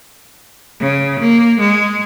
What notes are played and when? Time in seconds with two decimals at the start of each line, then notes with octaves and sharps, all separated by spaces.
0.81 C#3
1.20 A#3
1.60 G#3